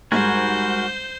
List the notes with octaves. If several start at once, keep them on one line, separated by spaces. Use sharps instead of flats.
G#2 G3 G#3 F#4 A#4 C5 G#5 G6